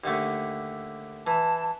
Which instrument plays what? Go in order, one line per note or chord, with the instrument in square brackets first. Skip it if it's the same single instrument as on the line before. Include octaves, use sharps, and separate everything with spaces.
[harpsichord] D#2 D3 A3
[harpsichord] E3 [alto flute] A5